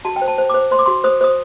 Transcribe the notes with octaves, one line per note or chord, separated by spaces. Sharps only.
F#4 A5
G5
C5
A5
C5
C5 D6
C5 C6
D6
F#4 C6
C5 D#6
C5 D#6